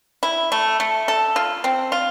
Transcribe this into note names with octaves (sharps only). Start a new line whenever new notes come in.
E4
A3
A3
A4
F4
C4
F4